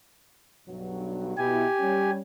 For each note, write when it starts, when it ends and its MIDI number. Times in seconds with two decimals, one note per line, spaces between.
0.68 1.36 35
0.68 1.36 43
0.68 1.36 54
1.38 1.65 47
1.38 1.65 64
1.38 2.11 67
1.38 2.11 80
1.80 2.20 55
1.80 2.20 61